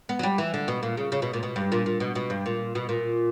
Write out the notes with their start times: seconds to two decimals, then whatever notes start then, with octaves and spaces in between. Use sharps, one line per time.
0.09 B3
0.19 F#3
0.23 G3
0.38 E3
0.54 D3
0.68 B2
0.83 A#2
0.97 C#3
1.12 C#3
1.22 B2
1.33 A#2
1.43 B2
1.56 G2
1.72 A#2
1.86 A#2
2.00 B2
2.15 B2
2.30 G2
2.46 A#2
2.75 B2
2.89 A#2